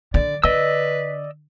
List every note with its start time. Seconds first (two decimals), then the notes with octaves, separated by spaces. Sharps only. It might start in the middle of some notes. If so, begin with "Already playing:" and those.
0.14 D3 D5
0.44 D3 B4 D5 D#5 E6